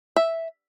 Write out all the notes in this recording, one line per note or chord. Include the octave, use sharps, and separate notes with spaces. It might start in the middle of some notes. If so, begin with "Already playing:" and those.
E5